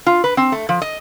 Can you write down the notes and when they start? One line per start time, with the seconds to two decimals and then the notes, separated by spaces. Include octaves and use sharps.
0.06 F4
0.24 B4
0.37 C4
0.52 A3
0.69 F3
0.82 D#5